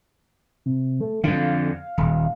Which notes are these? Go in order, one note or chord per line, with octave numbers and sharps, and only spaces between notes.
C3
A3
F2 D3 F5
D#1